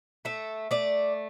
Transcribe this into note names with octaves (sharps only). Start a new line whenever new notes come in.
A3 E5
A3 D5